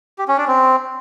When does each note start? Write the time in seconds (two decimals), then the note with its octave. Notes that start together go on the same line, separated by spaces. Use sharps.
0.18 G4
0.28 C#4
0.38 D4
0.47 C4